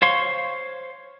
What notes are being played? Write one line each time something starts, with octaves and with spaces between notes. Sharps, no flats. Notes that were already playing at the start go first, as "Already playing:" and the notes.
C5 C#5 F5 C6 C#6